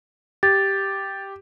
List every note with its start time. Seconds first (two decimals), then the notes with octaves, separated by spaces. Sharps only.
0.43 G4 A6